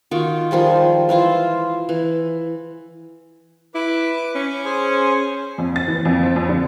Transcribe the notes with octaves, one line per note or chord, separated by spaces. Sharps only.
D#3 F4 F#4
D#3 F3 G3 G#3
E3 E4 F4 C5
E3
E4 B4 D6
C#4
G#4 C5 G#5
F2
A6
E3
F2
C4
F2
D3